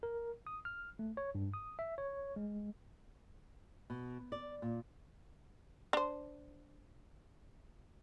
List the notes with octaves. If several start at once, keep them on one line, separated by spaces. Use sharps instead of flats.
A#4
D#6
F6
A3
C#5
G2
D#6
E5
C#5
G#3
B2
D5
A#2
D4 C5